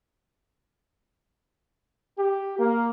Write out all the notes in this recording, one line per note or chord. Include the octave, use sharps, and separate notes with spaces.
G4
A#3